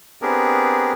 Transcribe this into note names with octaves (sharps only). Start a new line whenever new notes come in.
B3 C4 D4 G4 G#4 A#4